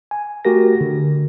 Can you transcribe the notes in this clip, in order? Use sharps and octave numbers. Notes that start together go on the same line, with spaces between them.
G#5
A3 F#4 G4 A#4 A#6
D3